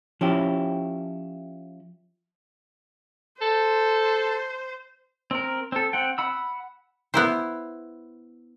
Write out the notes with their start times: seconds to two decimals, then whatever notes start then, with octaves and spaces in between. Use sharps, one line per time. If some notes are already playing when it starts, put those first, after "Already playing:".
0.21 F3 C#4 E4 G4
3.41 A4 C5
5.31 C4 A#4
5.72 C4 A4
5.93 C4 F#5 G5
6.18 F#5 B5 E6
7.14 B3 E4 C5